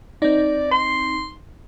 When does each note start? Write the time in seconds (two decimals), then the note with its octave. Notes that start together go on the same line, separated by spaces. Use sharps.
0.22 C4 D#4 D5
0.72 C6